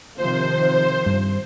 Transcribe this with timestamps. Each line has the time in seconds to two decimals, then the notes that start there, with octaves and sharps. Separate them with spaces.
0.16 C3 D#3 F3 C5
1.06 G2